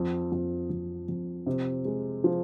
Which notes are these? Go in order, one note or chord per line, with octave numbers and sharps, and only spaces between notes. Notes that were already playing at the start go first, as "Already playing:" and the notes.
Already playing: F2
F2
F2
F2
C3
G#3
F3